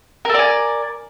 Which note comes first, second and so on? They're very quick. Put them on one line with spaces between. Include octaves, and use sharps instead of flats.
A#4 A4 D5 G#5